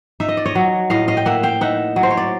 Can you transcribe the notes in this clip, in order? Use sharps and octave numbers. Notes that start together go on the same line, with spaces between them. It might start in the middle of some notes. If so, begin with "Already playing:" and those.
D#4 E5
D#5
D5
C#5 D#5
F#3
A2 D#5 F5
D#5 F5
G5
A#3 E5 F#5
F5 G5
D#4 E5 F#5
F#3
C5
C#5
D5